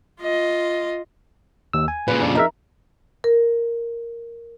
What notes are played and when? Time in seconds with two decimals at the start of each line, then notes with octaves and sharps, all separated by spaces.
0.20 F4 D#5
1.73 D#2 E6
1.88 G#5
2.08 A#2 C#3 B4
2.20 F2 D4
2.35 D#4 A#4 E5 A#5
3.24 A#4